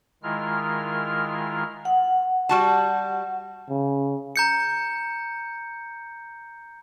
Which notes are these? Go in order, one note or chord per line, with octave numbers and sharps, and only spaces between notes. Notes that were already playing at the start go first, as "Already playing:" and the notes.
D#3 G#3 E4 F4 A#4 F6
F#5
G3 F#4 A5
C#3
A#5 G6 C#7